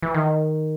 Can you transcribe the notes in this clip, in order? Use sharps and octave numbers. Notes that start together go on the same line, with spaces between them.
E3
D#3